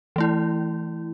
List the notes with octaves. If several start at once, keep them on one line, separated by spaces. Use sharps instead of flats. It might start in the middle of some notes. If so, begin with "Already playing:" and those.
E3 A3 E4